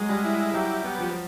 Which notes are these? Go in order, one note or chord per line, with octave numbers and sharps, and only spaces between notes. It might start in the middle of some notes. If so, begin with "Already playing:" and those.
Already playing: F#3 G#3
G3
E4
F#3 G4
B3
F3